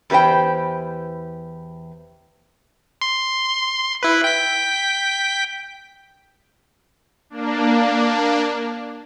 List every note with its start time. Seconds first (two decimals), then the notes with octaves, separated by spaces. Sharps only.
0.10 E2 G4 B4 C5 G5
3.01 C6
4.03 E4 B4
4.24 G5 B6
7.30 A#3 D4